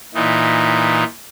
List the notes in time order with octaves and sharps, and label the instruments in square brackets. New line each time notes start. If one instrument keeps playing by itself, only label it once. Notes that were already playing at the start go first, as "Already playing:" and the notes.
[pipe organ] A#2 E3 D#4